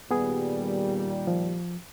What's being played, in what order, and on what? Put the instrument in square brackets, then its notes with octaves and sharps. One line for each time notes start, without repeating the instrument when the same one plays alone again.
[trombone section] A#2 D#3 G3 [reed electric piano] B3 G#4
[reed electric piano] F3